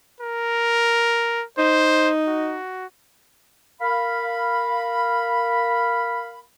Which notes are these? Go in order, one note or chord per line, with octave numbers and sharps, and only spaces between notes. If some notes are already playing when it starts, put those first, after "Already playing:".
A#4
D#4 C5
F#4
A#4 F5 B5